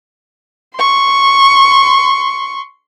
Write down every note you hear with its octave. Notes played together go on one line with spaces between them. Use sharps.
C6 C#6